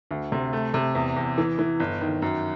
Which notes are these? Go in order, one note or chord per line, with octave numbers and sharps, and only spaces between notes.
D2
C3
A3
C3
E2
E2
E3
E3
G1
D#3
F#2